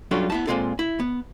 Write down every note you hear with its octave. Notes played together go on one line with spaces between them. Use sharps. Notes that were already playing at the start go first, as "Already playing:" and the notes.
F#3 G3 C#4 D4 F4 A4
B3 E4 A5
A#2 G3 G#3 C4 F4 A4
E4
B3